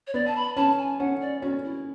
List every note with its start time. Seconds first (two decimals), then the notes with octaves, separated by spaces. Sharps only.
0.07 C#5
0.14 B3 D5
0.27 A5
0.36 B5
0.57 C#4 A5
0.78 G#5
0.99 C#4 F#5
1.21 D5
1.42 C#4 F#4
1.64 E4